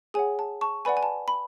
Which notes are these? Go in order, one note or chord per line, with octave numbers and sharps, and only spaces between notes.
G#4 C#5 F#5 G#5
A5
A5 C#6
B4 D5 F#5 G#5 B5
G#5
A5
B5